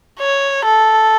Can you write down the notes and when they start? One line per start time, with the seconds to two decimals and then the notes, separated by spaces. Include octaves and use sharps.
0.19 C#5
0.65 A4